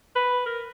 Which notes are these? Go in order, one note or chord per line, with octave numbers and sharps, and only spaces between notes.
B4
A#4